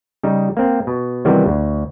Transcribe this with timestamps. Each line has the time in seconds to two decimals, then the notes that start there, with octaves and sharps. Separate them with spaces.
0.23 C#3 G3 D#4
0.57 A#3 C4
0.87 B2
1.25 C3 D#3 E3 F#3 G3 B3
1.46 D2